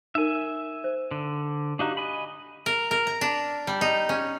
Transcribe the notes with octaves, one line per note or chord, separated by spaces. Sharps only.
D#4 A#4 E5 G#5
C5
D3
D4 D#4 F#4 G4 F5 A#5
D#5 G#5 B5
A#4
A#4
A#5
D4
G3
D#4
C#4